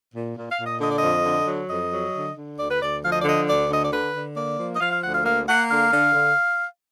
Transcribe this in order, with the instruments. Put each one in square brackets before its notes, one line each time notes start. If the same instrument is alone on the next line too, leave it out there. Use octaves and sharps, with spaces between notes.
[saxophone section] A#2
A#2
F5
A#2
D#5
D3 D#5
D5
D#5
F2
D3
F#3
F2 D#5
F#3
D3
D3
D2 D5
B4
D2 D5
F3 F5
D#5
D5
D3 D#5
D2 D5
D3 D#5
D5
D3 B4
D3
A#3 D5
F3
D#5
F3 F5
F5
D2 F#5
F5
A#3 F5
A#3 F#5
D3 F5
D3
D3